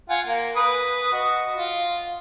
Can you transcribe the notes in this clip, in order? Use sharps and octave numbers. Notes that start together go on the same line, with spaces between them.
F4 F#5 G#5
A#3
B4 D#6
F#4 D#5
F4